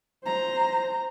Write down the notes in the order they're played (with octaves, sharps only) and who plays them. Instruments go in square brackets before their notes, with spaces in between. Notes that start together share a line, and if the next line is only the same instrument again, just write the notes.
[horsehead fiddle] C5 A#5